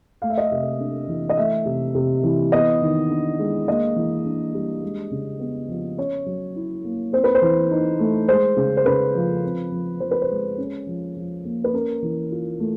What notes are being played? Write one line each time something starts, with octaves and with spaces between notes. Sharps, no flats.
A3 F5
E5
D#5
E5
C3
D4
E3
D#5
A3 E5
C3
C3
E3
B3 D#5
D#3
D4
G#3
A#3 D#5
E3
D4
G3
G#3
C#3
B3
F3
C#4 C#5
F#3
E4
A#3
C4 C5
B4
C5
E3
D#4
A3
G#3 C5
C#3
C5
C#3 B4
F3
C4
F3
F3 C5
B4
C5
G#3
C#4
F3
F3
A#3
B4
C#4 A#4
E3
F4
A3